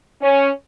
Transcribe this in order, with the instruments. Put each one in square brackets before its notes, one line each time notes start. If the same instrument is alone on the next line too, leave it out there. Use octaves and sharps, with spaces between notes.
[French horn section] C#4